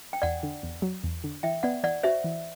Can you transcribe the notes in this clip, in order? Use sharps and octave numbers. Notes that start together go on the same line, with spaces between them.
G5
E2 D5 F#5
D3
E2
F#3
E2
D3
E3 E5 G5
B3 D5 F#5
E3 D5 F#5
F#4 C5 E5
E3